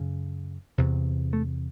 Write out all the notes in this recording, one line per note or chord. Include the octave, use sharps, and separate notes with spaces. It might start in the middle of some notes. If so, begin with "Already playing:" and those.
Already playing: F#2 C#3
E2 C3
A3